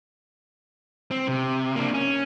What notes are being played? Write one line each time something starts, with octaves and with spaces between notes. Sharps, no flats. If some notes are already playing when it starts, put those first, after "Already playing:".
C4
C3
A#3 D4
C#4